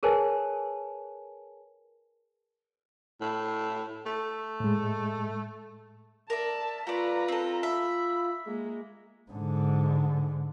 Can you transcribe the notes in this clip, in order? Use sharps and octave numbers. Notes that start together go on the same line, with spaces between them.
G#4 A#4 B4 C#5 G#5 A5
A2
A3
A2 G#3
A#4 D5 E5 A5
A3 F4 B4 D5 A#5
C4 A4
E5 B5
G#3 A#3
G#2 D3